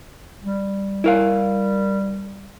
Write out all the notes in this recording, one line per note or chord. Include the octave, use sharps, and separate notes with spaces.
G3
E4 A#4 F5